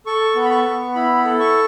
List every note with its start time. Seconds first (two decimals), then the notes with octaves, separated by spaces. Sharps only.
0.06 A4 C#6
0.35 B3
0.45 B5
0.50 C#6
0.65 B3
0.95 E4 B5
1.25 A4
1.40 C#6